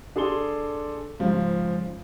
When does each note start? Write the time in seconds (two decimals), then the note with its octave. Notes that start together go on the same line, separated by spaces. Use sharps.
0.16 D4 G#4 A4 C6 G7
1.20 G#2 C#3 F3